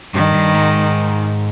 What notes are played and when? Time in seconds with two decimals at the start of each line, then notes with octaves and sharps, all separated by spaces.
0.14 G2 D#3
0.34 G2
0.55 G#2